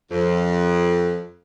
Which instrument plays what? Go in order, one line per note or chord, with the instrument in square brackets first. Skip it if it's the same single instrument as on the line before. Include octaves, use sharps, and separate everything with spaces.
[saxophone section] F2